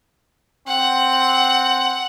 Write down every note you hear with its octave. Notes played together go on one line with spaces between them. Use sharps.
C4 F#5